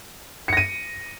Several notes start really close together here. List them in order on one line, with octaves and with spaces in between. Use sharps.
C#7 A#6 D#7